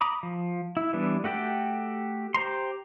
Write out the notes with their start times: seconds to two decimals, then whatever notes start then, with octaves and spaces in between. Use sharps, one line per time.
0.01 A#5 B5 D6 D#6
0.23 F3
0.77 E4
0.93 E3 G3 B3 D4
1.24 A3 F#4 G4 A4 G5
2.34 G4 C5 A#5 C6